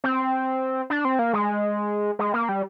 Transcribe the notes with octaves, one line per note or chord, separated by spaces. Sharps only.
C4
D4
C4
A#3
G#3
G#3
A#3
G3